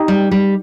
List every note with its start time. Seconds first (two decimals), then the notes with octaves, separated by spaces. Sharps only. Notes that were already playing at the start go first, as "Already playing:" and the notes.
Already playing: D#4 G4
0.08 G3
0.31 G3